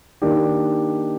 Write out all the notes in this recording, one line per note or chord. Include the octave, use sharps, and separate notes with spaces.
D#3 A#3 D4 G4